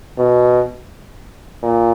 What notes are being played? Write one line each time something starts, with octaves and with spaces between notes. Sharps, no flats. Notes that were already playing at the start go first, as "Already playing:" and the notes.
B2
A#2